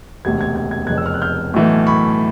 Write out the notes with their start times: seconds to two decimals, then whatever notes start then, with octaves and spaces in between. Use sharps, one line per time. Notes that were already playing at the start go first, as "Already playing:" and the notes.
0.25 E1 D2 C3 G#6
0.41 G#6
0.56 G#6
0.71 G#6
0.87 F1 F2 C#3 F#6 G#6
0.98 E6
1.06 F6
1.14 F#6
1.22 F6 G6
1.54 B1 A2 E3 A3
1.87 B5 C#6